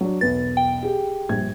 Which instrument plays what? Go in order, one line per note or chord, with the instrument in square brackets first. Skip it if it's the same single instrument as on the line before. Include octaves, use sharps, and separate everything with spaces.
[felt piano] F#3 D4
[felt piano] E1 B1 B4 [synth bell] A6
[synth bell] G5
[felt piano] G4 G#4
A#1 G2 G#6